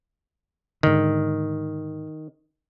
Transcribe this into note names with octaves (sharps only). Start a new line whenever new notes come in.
G#2 D3 D#3